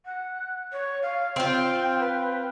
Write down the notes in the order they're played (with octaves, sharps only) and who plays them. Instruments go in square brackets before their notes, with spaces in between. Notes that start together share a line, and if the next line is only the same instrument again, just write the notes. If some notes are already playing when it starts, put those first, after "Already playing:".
[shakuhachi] F#5
C#5
F5
[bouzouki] C4 F4 [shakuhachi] G5
[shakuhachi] B4